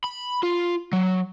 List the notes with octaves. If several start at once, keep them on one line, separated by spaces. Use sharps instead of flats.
B5
F4
F#3